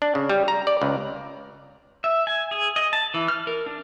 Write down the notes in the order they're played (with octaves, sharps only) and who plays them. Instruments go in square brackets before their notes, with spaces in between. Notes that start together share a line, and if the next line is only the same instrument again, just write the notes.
[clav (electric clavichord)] D4
C#3
G3
A#5
D5
C#2
[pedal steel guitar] E5
G#5
G#4
D#5
A5
E3
F6
A#4
D4